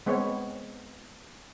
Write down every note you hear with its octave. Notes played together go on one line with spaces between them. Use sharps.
G#3 B3 C4 C#5